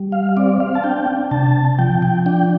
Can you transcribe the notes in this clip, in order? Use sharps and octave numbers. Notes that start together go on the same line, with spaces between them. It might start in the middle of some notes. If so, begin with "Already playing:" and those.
Already playing: G3
F5
C4 D5
F5
A5
D4 G5
C3 A5
F3 G5
G5
D4 G5